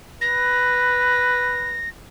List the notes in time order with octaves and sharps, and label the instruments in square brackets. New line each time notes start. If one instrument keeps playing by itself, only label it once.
[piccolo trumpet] B4 [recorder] A#6